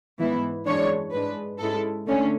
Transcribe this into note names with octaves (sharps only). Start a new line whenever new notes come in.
G#2 E3 B3 E4
F#2 E3 G#3 D4 C#5
G#2 G#3 D4 B4
G#2 G#3 C#4 E4 A4
D3 A3 C#4